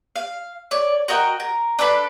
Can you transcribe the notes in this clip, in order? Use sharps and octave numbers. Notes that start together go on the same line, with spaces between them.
F5
C#5 D5
F#4 A#4 D#5 G5
A#4
D4 A4 B4 B5